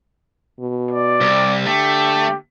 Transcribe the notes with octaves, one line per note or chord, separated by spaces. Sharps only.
B2
D5
C2
D3 A3 G4